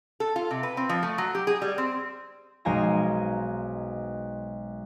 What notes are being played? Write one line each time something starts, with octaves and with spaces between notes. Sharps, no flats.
A4
F4
C3
B4
C4
F3
A3
F#3
G4
G#4
G3
C4
B1 G#3 C5 F5 G#5 A#5